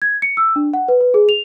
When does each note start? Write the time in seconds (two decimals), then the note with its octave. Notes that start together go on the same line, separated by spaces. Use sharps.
0.02 G#6
0.22 C#7
0.37 E6
0.56 D4
0.74 F#5
0.88 B4
1.01 B4
1.14 G#4
1.29 F7